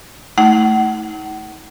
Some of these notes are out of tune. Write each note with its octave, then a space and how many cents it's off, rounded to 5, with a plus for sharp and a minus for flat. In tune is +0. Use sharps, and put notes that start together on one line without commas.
A3 +0 D#4 +40 F#5 +35